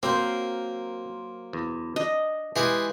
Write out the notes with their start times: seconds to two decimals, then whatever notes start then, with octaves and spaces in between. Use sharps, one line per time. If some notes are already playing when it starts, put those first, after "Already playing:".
0.03 F#3 A#3 C4 A#4 C5
1.53 E2
1.96 D4 D#5
2.56 E3 G#3 G4 G#4 B4